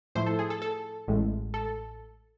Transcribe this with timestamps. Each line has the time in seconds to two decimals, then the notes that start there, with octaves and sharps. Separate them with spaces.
0.15 A2 F3 A3 E4 C5
0.26 A4
0.39 G#4
0.50 A4
0.62 A4
1.08 A1 A2 G#3
1.54 A4